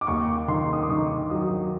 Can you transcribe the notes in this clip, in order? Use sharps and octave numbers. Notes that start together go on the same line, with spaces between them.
D6
D#2 C#6
D#3 C6
D#6
D6
D#3 C#6
F#3 D#6